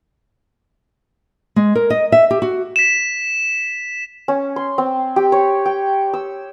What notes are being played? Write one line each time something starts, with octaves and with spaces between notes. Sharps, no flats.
G#3
A#4
D#5
E5
G4
F#4
B6 E7
C#4
C6
C4
G4
C#5
G5
E6